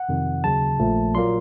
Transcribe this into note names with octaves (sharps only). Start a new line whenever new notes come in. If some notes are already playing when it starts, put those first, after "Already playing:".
Already playing: F#5
F2 C3 D#3
D#2 C#3 F#3 A5
A#1 A#2 F3 A3
A#2 F#3 A#3 C6